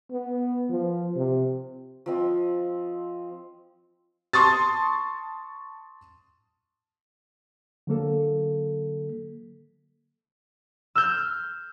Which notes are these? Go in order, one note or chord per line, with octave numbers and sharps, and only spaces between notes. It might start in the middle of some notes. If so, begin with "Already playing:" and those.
B3
F3
C3
F3 C4 D#5
A5 C6 C#6 D#6 A6
D3 F#3 A#3 A4
E6 F6 G6